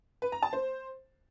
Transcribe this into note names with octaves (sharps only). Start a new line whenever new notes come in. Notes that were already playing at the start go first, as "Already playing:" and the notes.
B4
A#5
A5
C5